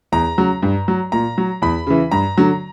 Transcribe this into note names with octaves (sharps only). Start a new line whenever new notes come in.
E2 A#5
C#3 F#3
G2
F#3
A#2 A#5
F#3
E2 B5
C#3 E3
G2 A#5
D3 F#3